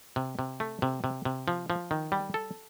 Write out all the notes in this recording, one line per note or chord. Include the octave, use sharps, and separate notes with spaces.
C3
C3
A3
C3
C3
C3
F3
F3
D#3
G3
A4